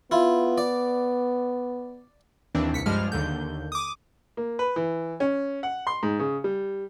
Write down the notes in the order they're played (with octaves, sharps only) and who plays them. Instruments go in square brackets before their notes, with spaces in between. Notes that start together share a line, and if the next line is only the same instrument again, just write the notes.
[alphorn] B3 [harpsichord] E4 F4
[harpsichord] D5
[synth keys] D#2 E3 C4 D4
C2 B6 C#7
G2 F3 G3 G#3 F6
D#2 D3 G6
D6 D#6
[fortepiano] A#3
B4
E3
C#4
F#5
C6
G#2
C#3
G3